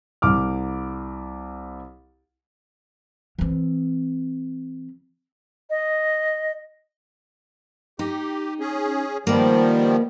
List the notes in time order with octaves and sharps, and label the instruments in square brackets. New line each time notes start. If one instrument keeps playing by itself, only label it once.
[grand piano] C2 D6 F6
[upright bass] E3 C4
[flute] D#5
[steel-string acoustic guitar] D#4 [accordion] G4
[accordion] C#4 G#4
[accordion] D#3 F3 G3 [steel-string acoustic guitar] A#3 B3 D5